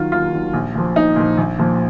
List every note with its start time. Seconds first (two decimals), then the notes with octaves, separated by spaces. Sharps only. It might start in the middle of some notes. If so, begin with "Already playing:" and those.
Already playing: D#3 F#3 F4
0.12 D#2 F4
0.32 D#3 F#3
0.53 A#1
0.75 A#2 F3
0.96 A#1 D#4
1.16 A#2 F3
1.37 A#1
1.59 A#2 F3